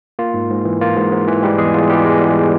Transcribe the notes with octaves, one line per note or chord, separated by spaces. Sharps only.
A#3 F4
G#2
G#2
E3
A#3 F4
G#2
G#2
E3
G3 G#3 G4
E2 G#3 G#4
E2 F4
E3 G3 G4
G#3
E2